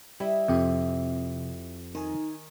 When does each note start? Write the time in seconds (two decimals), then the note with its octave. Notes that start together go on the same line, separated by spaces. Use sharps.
0.20 G3 E4 D#5 E5
0.48 F2 C3 F3 C4 G4
1.95 D#3 D#4 G#5